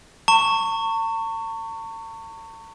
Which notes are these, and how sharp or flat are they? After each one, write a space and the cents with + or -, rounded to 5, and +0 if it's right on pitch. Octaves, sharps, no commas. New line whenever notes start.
A5 +45 C#6 +0